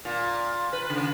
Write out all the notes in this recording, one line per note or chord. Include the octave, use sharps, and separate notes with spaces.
A#2
B4
C#3